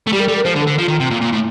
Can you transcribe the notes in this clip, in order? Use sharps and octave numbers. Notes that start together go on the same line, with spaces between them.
A3
G3 G4
A#4
G3 A4
A#4
F3 C5
D3
A4
D3
F3 F4
D#3
C3
A#2
A#2
A2